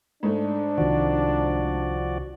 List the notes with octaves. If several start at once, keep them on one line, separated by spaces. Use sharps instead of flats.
G#2 A3 D4
C2 D#3 F3 F#4 D5